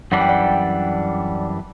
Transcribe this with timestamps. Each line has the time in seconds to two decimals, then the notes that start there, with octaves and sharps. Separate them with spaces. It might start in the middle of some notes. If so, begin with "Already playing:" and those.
0.12 F#2 E3 G3 D4 F#5
0.21 G5
0.29 D5 F#5